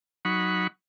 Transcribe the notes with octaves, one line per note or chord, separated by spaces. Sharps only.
F#3 D#4 F#5 B5 C#6